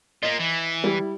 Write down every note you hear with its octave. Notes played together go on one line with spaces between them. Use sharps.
A#3 F4 D#5
E3
G3 E4